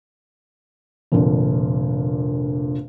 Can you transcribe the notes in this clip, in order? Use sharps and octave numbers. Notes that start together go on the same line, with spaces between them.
F1 A#2 D3